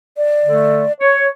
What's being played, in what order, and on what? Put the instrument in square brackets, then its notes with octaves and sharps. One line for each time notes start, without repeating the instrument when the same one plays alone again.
[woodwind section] D5
D3 A3
C#5